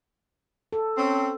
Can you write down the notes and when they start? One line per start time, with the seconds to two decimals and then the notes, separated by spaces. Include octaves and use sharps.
0.73 A4
0.97 C4 C#4